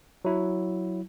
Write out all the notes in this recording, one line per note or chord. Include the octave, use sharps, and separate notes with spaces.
F#3 E4